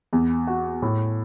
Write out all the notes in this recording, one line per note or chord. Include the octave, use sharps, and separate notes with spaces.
E2
F#4
A2